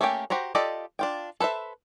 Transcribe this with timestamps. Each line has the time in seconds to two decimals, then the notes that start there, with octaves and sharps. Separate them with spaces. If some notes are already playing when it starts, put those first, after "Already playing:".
0.01 A3 A#3 C#4 G4 G5
0.30 F#4 G4 C5 A#5
0.55 F4 G4 A4 D5 D#5
0.99 D4 F4 G5
1.40 A4 B4 C5 E5